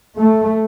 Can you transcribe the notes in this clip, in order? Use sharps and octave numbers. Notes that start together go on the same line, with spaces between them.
A3